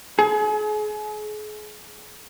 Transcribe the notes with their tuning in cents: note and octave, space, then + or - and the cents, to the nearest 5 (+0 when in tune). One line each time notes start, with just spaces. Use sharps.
G#4 +35